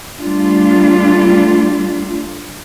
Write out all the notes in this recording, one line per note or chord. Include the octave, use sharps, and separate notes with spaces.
G3 A3 D4 F4